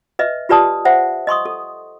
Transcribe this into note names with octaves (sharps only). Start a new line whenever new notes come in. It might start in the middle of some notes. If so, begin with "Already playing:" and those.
B4 D#5 E5
F4 G4 B4 D5 A5 D#6
C5 E5 F#5
D#5 C6 C#6 D#6
A4